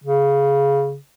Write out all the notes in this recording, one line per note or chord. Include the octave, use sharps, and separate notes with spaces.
C#3